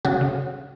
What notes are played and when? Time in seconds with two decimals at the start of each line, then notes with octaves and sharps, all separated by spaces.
0.05 C#3 F#4
0.21 C#3